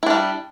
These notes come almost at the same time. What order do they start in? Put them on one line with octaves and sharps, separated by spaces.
E4 D4 G3